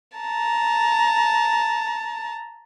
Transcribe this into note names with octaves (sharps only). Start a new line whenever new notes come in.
A5 A#5